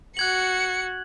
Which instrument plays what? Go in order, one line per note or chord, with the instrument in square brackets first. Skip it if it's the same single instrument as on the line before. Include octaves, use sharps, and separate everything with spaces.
[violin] F#4 C#7 [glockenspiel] F#6 G#6 F#7